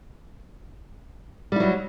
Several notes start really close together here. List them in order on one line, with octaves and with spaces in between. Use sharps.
G3 E4 F#3